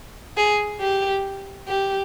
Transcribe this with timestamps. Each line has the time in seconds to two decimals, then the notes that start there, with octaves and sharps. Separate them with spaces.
0.37 G#4
0.81 G4
1.68 G4